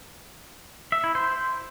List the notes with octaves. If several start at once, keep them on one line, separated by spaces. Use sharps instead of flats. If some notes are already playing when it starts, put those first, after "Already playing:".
E5
E4
C5